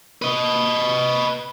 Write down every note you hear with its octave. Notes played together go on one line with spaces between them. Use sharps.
B4 D#5